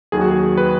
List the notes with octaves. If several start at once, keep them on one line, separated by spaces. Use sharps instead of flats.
D#2 D#3 F#3 G#4
F#4
G#4
B4